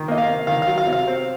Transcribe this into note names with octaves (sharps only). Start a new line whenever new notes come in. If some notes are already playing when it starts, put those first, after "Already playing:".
Already playing: D#3
A#3 D#5
F5
C3
D#3 F5
F#3 F5
F5
C3
F5
C4